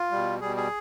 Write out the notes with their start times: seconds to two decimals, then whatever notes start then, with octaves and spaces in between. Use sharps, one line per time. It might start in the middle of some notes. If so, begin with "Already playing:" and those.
Already playing: F4
0.12 B2 G3
0.41 B2 G3 G#4
0.56 G#4